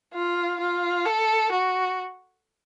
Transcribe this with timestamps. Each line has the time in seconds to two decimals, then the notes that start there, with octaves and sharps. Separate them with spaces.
0.14 F4
0.60 F4
1.06 A4
1.52 F#4